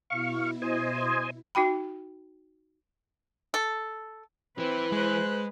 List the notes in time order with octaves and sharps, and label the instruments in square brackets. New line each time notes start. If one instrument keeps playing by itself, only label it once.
[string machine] B2 E4 [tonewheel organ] F5 C#6
[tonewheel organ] C5 D#5 G#5
[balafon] D#4 F#4 G5 B5
[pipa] A4
[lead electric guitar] E3 [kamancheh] C4 [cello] B4
[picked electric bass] G#3 [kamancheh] C5 F#6